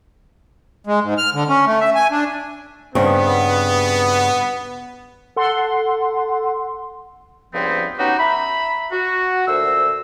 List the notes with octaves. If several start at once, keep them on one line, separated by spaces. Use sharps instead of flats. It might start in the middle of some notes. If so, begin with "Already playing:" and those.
G#3
G#2
F6
D3
C#4
A3
E5
G#5
D4
G2 C#3 B3 C4
A4 F#5 C6
C#2 G2 F3 B3 C4
B3 C#4 D#4 F#4 G4
E5 A#5 B5
F#4
D2 A#2 C5 E6